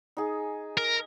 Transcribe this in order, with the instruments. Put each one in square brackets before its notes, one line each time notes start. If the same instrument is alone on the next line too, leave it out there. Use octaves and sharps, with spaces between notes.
[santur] D#4 G#4
[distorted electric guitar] A#4